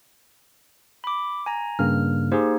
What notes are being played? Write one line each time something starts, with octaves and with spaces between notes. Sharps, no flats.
B5 D6
G#5 A#5
G2 C#3 A#3 F6
A#3 D#4 G4 G#4 C5